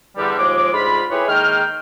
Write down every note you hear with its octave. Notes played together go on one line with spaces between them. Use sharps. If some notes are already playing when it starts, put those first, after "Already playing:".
E2 D3 G3
D#2 F3 G#3 D6
D2 G#2 F4 B5
A3 E4 G4 G#4 B4 C#5
D#3 G#3 A#3 G5 F6